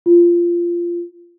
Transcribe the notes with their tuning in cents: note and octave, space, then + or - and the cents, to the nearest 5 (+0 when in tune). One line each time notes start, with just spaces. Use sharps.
F4 -15